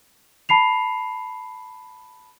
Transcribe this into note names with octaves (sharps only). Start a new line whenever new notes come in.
A5 B5 C7 F7